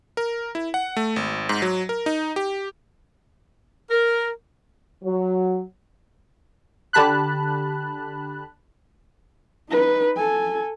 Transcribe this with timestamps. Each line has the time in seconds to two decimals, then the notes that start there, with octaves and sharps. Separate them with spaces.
0.17 A#4
0.55 E4
0.74 F#5
0.97 A3
1.16 G#1
1.49 G#2
1.62 F#3
1.89 A#4
2.06 D#4
2.36 G4
3.90 A#4
5.04 F#3
6.93 D3 G4 A5 B5 F#6
9.70 D#4 B4
10.17 A4 G#5